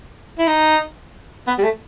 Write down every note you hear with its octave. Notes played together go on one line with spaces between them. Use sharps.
E4
D#4
B3
G3
A3